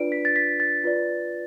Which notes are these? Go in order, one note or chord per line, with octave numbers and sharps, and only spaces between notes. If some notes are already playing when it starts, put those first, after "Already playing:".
Already playing: D4 F4 B4 D5 D7
B6
A6
B6
A6
F4 B4 D5